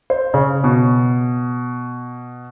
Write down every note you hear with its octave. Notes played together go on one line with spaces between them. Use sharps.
C5
C#3
B2